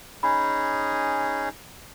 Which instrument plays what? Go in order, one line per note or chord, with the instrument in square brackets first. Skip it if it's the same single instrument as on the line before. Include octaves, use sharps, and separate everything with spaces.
[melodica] C#4 D#4 G#4 [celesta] B5